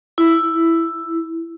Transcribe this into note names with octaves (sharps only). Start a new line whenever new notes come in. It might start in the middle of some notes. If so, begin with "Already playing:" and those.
E4